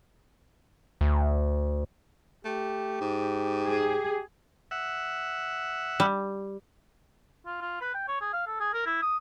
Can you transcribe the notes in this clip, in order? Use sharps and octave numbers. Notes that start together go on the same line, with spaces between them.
D2
A3 G4
G#2
G#4
E5 F#5
G3
F4
F4
B4
G5
C#5
G#4
F5
A4
G#4
A#4
E4
D#6